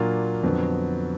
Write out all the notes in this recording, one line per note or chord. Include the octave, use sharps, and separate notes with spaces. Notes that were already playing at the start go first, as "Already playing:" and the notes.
Already playing: A#2 F#3 A#3 D4 F4
F2 D3 F#3 B3